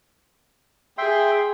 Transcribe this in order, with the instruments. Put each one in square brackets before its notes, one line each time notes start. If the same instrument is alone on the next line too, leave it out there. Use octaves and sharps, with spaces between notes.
[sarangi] G#4 [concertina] E5 G5 C6